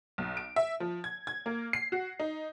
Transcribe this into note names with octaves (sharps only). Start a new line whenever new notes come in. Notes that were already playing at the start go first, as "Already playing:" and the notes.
B1
D7
E5
F3
G#6
G#6
A#3
C7
F#4
D#4